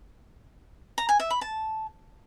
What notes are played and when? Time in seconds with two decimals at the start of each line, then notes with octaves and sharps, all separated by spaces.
0.98 A#5
1.09 G#5
1.20 E5
1.30 B5
1.41 A5